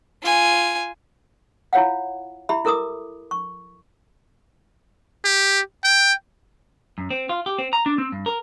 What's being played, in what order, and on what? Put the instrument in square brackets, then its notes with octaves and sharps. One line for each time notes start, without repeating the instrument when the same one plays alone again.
[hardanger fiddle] F4 G#5
[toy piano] E4 F4 C#5 F5 F#5
E4 G4 E5 B5
E4 A4 A#4 D6 D#6
C#6
[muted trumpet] G4
G5
[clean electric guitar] F#2
C4
F4
G4
C4
A#5
D4
C4
G2
A#4